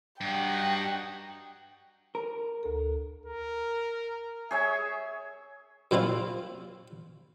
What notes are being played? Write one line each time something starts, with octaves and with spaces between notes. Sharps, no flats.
G2 D#4 F#4 F#5 G5
A#4
D2 A4
A#4
G#4 C#5 E5 G#5
F#2 A#2 C4 E4 F4